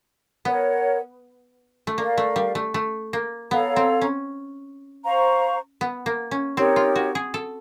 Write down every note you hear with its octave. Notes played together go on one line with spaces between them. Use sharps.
B3 A#4 C#5 F#5
A3
A#3 A#4 D5 F5
A3
G3
A3
A3
A#3
B3 A4 C#5 F5 A#5
C4
C#4
C5 F5 A#5 C#6
B3
A#3
C#4
C4 D#4 G4 A#4 C#5
F4
F#4
G#4
A4